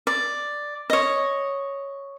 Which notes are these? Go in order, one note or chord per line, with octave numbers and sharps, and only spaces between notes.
D5
C#5 D#5